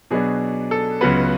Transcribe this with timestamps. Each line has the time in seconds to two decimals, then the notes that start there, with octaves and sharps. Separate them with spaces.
0.11 B2 F#3 B3 D4 G#4
0.71 A4
1.01 C#2 C#3 F#3 B3 B4